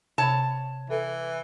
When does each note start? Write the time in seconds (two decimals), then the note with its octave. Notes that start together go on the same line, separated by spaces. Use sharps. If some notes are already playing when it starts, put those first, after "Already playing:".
0.18 C3 C#5 A5 B5
0.90 E3 A4